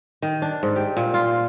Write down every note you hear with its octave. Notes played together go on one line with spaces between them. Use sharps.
D#3
D4
G#2
G4
A#2
F4